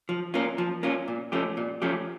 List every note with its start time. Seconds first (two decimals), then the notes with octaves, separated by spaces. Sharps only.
0.09 F3
0.34 A#3 C#4 F4
0.58 F3
0.83 A#3 C#4 F4
1.08 A#2
1.32 F3 A3 C#4 G4
1.57 A#2
1.82 F3 A3 C#4 G4